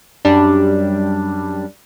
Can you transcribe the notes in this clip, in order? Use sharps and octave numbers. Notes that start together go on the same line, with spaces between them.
F#2 G3 D4